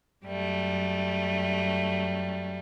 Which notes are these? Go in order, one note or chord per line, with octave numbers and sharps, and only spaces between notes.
F#2 G3 A3